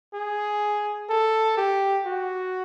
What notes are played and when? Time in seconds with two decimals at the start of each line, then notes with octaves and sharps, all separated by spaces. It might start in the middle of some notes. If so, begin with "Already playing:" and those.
0.14 G#4
1.09 A4
1.57 G4
2.06 F#4